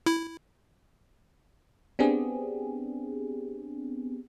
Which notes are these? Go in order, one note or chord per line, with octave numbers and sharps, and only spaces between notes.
E4
B3 C4 D4 G4 G#4